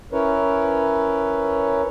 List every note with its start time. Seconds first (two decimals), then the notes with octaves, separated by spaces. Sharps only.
0.12 C#4 E4 A#4 B4 C#5